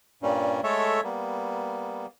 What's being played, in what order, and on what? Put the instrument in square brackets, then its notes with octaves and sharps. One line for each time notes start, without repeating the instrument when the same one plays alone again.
[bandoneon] G2 A#2 G3 C#4
G#3 A3 A4 C#5 E5
G3 A#3 B3